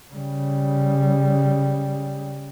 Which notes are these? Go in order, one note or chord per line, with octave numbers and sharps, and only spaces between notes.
C#3 G3